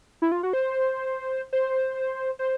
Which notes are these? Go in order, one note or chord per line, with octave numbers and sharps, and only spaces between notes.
E4
F4
F#4
C5
C5
C5